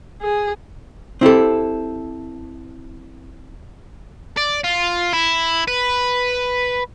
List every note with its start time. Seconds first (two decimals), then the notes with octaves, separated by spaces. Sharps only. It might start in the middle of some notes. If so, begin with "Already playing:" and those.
0.21 G#4
1.21 C4 E4 G4 A4
4.37 D5
4.64 F4
5.13 E4
5.68 B4